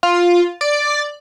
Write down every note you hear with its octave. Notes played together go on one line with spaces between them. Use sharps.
F4
D5